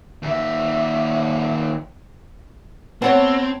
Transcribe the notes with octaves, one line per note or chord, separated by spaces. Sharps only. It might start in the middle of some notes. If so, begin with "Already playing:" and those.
D#2 E5
B3 C4 C#5 F#5 A5